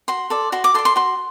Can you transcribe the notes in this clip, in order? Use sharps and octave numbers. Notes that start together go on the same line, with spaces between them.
F#4 C6
A4 D5
F#4 C6
D6
A4 D5 C6
C6
F#4 C6